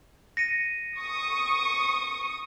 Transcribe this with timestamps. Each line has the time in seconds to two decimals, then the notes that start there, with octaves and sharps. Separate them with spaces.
0.37 A#6 C#7 D#7
0.98 C#6 D#6